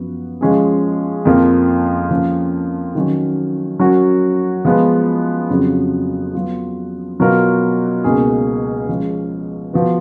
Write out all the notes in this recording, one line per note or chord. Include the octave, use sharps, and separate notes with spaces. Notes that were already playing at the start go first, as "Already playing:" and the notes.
Already playing: F#2 F3 B3 F#4
F3 G#3 C#4 G#4
F2 F3 A#3 F4
F3 A#3 C#4 F4 A#4
D#3 F#3 C#4
F#3 C#4 F#4 A#4
F3 G#3 B3 F4
F2 C#3 F#3 C#4 F4
F#3 B3 F4
B2 F#3 B3 F4 A#4
C#2 B2 A#3 D#4 G#4
F3 G#3 C#4
F3 B3 F#4 B4